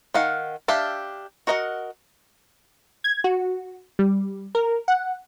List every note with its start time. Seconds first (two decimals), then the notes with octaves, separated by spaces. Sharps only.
0.14 D#3 F5 F#5
0.68 D4 G4 E5 F5 A5
1.47 F#4 A#4 D#5 F5 F#5
3.04 G#6
3.24 F#4
3.99 G3
4.55 A#4
4.88 F#5